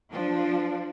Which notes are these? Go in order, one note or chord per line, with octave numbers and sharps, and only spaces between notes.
F3 D4